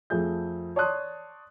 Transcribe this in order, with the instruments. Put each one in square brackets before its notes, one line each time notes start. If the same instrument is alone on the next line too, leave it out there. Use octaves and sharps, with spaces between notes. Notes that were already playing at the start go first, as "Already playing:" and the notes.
[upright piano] F2 A3 G#4 G6
C#5 D5 A5 C6 D#6 F#6